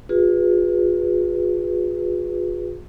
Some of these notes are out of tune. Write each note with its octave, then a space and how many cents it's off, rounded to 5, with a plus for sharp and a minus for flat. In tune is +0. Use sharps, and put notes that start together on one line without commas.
F4 +35 G#4 -20 B4 +0